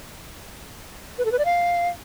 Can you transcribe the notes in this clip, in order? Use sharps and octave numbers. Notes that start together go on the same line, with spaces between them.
B4
A4
B4
D5
F5